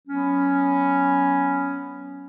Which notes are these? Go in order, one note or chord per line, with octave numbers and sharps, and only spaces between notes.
F#3 B3 C#4